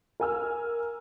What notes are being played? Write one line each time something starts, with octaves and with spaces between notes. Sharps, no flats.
A#4 G#5 E6 F6